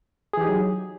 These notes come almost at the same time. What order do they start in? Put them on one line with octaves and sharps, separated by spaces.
G#4 E3 G4 D#4 F#3